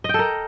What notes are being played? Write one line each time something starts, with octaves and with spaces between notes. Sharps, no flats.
A4 A#4 D#5 G5